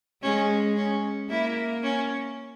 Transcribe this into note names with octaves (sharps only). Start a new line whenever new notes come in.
G#3 C#4
C#4
A#3 E4
C#4